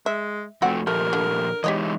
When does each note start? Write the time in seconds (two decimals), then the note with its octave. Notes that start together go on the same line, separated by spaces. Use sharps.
0.06 G#3 E5
0.62 F2 A3 C4 F#4 D5 F#5
0.87 A#2 F3 A3 G4 A#4
1.13 D3
1.64 E3 G#3 D#4 G4 C#5 D#5